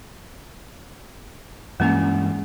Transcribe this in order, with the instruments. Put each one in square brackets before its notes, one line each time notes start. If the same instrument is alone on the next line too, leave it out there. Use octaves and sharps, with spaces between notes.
[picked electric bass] G2 E3 G#3 [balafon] A#3 C#4 G#5